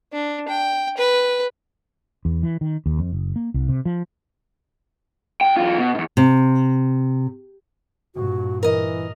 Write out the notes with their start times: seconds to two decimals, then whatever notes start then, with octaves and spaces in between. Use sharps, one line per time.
0.13 D4
0.49 G5
0.98 B4
2.25 E2
2.43 E3
2.61 D#3
2.86 D#2
2.99 F2
3.13 F#1
3.36 A#3
3.54 C2
3.69 C3
3.85 F3
5.41 C2 G5
5.57 E2 F4
5.78 B2
5.95 E2 G#2
6.17 C3
8.15 G2 A#2 F#4
8.63 E3 A#4 D#5